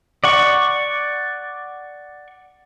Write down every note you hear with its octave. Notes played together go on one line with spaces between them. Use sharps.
D5 F#5 C#6